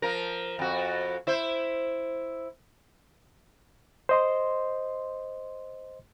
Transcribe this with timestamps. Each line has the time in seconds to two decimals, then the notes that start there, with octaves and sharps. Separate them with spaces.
0.02 F3 A#4
0.59 F2 F#4
1.27 E4 C5
4.09 C5 D#5 C6